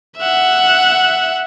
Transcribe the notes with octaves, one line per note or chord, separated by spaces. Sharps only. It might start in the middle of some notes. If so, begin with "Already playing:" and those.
E5 F#5